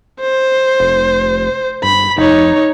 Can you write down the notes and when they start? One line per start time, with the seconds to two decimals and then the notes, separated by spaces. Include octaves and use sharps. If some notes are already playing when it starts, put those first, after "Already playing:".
0.21 C5
0.80 F1
1.83 G1 B5
2.18 F1 D#4 C#5